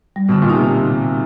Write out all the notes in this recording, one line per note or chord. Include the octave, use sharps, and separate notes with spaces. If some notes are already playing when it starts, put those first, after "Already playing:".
G3
B2
D3
A#2
C3 D#4